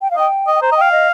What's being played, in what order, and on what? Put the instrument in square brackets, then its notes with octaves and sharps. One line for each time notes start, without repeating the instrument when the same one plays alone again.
[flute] G5
F5
[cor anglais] D#5 [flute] G5
[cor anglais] D#5
[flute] G5
[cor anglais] C5 [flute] A#5
[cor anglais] D#5
[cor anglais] F5 [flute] G5
[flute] D#5